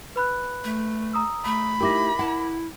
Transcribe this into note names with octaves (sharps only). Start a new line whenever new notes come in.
B4 B5 F#6
A3
A#5 D#6 E6
A3 B5
D#4 E4 G4 A#4 D6 A#6
E4 F#5 A5